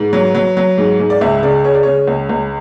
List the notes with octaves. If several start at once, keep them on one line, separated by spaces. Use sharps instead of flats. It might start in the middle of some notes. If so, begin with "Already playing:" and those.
Already playing: G#2 B4
F#3
F#3
F#3
G#2
G#2
D5
C#2 E5
C#3 D5
G#3 C#5
D5
C#3 C#5
C#2
C#2